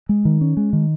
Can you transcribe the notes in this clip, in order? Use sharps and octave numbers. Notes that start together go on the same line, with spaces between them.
G#3
D#3
C#4
G#3
D#3